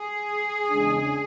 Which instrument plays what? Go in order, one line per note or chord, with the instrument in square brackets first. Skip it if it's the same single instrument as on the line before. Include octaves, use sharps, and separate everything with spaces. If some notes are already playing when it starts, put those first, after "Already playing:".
Already playing: [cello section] G#4
[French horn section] E2 C#3 G#3 D4